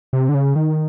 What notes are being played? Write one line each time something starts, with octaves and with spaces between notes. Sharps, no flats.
C3
D3
C#3
D#3